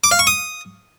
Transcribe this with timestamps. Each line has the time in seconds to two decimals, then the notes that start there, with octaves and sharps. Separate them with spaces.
0.04 D6
0.11 F5
0.19 C#6
0.27 D#6